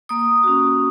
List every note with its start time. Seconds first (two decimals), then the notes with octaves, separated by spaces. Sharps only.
0.09 A#3 D#6
0.43 C#4 F#4